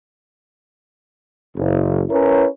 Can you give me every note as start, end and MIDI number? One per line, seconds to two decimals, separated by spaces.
1.57 2.03 30
2.10 2.46 61
2.10 2.46 64
2.10 2.46 70
2.10 2.46 71
2.10 2.46 73